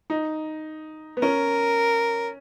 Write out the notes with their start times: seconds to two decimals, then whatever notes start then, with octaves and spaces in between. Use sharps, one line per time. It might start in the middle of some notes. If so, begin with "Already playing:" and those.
0.10 D#4
1.17 B3
1.22 C#4 A#4